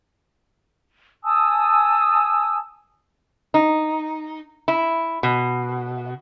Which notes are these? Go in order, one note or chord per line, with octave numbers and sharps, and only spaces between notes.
G#5 A5 D#6 E6
D#4
E4
B2